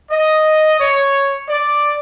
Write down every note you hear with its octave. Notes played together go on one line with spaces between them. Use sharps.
D#5
C#5
D5